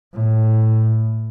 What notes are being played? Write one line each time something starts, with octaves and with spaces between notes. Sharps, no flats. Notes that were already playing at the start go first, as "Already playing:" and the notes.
A2